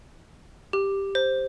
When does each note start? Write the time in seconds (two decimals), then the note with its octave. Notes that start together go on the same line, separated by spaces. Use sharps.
0.73 G4
1.15 C5